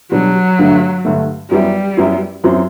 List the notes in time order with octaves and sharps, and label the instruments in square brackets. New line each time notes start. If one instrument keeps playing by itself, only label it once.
[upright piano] B2 G3 D4 [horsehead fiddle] F#3
[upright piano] G2 D3 A3
G2 D3 A3
[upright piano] F#2 F#3 B3 E4 [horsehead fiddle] G3
[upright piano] F#2 F#3 B3 E4
F#2 F#3 C4 E4